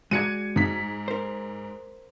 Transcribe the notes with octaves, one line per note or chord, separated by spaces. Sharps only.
G#3 F#4 D5 G#6 C#7 D#7
G#2 B6
A#4 C5